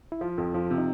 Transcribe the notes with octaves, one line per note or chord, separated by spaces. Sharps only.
E4
F3 F4
F2
F3
C3
D#4